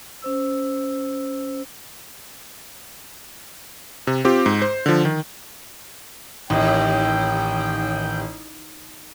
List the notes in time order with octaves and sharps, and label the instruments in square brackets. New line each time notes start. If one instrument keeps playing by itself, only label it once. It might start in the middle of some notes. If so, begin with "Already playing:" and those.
[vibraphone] C#4 C5 E6
[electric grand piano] C3
C4 F4 G4
G#2
C5
D3 F3
D#3
[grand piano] A1 [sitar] D#2 [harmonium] G5